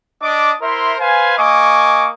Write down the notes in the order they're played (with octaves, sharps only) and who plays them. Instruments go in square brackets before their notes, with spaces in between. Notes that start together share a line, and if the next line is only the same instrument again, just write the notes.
[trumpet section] D4 D#5 D6
E4 A#4 C5 E5 C6
B4 C5 F5 G#5
A#3 D#5 G#5 C#6 D6